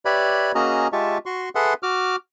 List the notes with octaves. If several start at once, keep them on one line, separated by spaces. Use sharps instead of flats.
G4 B4 C#5 D5 E5 B5
A#3 C#4 F#4 G#4 D#5 A#5
G#3 F4 G4 E5 A5 C#6
F#4 C6 C#6
G#4 A4 B4 E5 F#5 C6
F#4 D6 F6